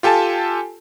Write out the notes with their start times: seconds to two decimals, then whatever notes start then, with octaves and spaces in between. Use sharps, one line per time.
0.03 F4 G4 A4 G#5 A5